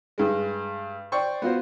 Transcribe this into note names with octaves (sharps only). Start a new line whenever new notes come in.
G2 G#3
C5 D5 G5 C#6
B3 F4 F#4 C5